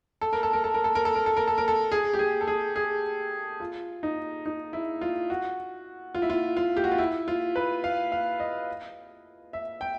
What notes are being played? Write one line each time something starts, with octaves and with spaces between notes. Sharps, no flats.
A4
A#4
A4
A#4
A4
A#4
A4
A#4
A4
A#4
A4
A#4
A4
A#4
A4
G#4
G4
G#4
A4
G#4
G#4
F4
D#4
D#4
E4
F4
F#4
F4
E4
F4
F4
G4
F#4
F4
E4
F4
B4
F5
F5
D#5
E5
G5